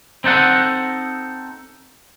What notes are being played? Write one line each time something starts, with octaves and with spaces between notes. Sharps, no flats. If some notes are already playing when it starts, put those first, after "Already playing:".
C4 D#4 A4 F#5